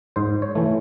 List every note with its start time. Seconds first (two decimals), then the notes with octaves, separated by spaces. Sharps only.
0.16 G#2 C5
0.42 C#5
0.55 E3 A3